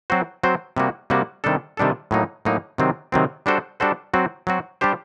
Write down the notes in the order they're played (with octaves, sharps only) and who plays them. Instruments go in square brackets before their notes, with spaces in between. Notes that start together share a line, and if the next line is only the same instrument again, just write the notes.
[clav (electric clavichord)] F#3 C4 F#4 C5
F#3 C4 F#4 C5
C3 G3 A#3 F#4
C3 G3 A#3 F#4
C3 D#3 G3 D4 A4
C3 D#3 G3 D4 A4
A2 F#3 A#3 D#4
A2 F#3 A#3 D#4
C3 D#3 F#3 C4
C3 D#3 F#3 C4
G3 D4 F#4 A4 C5
G3 D4 F#4 A4 C5
F#3 C4 F#4
F#3 C4 F#4
G3 D4 G4 C5